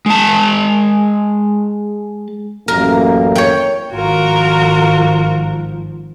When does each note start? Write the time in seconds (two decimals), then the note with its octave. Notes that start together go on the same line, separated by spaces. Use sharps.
0.06 G#3 A5
2.68 A1 F#2 A#3 A#4
3.35 C#5 G5
3.93 G#1 F3 F4 F#4 A#4